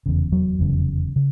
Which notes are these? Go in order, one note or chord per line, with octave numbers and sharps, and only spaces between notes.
F1 E2 C#3
F#3
F1 E2 C#3
C#3